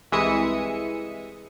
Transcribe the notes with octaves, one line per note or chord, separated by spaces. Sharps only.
C2 E3 G#3 E5 D#6 C#7